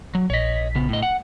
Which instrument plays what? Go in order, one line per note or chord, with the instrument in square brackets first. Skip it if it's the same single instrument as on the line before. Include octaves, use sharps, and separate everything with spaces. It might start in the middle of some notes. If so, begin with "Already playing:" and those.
[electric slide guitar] F#3
[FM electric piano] A#1 B6 [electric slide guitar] C#5 D#5
[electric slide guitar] C#3 B3
A2 D#5
F#5